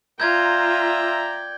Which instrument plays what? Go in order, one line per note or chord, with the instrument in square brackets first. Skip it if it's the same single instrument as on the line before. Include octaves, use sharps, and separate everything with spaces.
[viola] F4 [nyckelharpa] D5 G5 [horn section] E5 A#5 [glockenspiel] G6 G#6